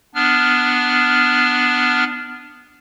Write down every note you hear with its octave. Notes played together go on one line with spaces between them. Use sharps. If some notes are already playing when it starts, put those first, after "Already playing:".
B3 D4 F6